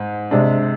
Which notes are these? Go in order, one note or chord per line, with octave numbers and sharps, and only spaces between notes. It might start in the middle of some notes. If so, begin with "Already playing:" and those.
Already playing: G#2
C3 G#3 D4